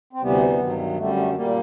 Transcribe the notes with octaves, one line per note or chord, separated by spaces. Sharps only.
C4
D2 C3 E3 G3 B3
G2 D#3 F#3
F#2 D3 G3 A3
A3
A#2 G3 A#3